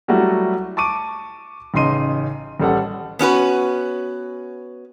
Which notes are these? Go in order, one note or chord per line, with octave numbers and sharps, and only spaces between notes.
F#3 G3 A3 E4 F#4
A5 C#6 D6 D#7
A1 C#3 D#4 C6 D#7
A1 G3 A4 F#5
B3 C#4 F#4 B4